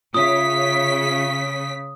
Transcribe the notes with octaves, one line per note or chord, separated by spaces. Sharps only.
C#3 F4 C#5 E5 D#6 B6